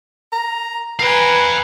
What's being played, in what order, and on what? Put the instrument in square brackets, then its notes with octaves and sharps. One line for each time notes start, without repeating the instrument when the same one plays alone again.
[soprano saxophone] A#5
[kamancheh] B4 G#5 [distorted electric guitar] F5 G5 [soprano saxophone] A#5